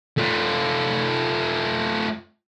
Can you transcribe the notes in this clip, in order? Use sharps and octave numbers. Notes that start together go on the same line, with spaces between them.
A3 F4